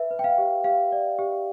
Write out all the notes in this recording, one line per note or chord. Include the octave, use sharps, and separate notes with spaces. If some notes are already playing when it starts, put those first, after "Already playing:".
Already playing: B4 E5
B4
G5
F5
G4
G4 F5
D5
G4